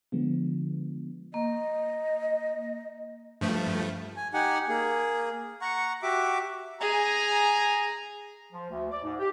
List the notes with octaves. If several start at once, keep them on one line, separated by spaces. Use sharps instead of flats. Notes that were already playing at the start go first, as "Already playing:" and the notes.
D3 F3 G#3 B3
A#3 D#5
G2 F3 A3
G#5
D#4 G4 F#5 G#5
A#3 G#4
F#5 A#5 C#6
F#4 G4 E5 D6
G#4 G#5 A#5
F3
D2
D5
G#2
G4